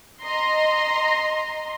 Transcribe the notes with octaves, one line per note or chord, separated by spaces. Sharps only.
D#5 A#5 C6